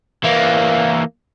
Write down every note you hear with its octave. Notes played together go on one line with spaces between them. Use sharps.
E3 A#3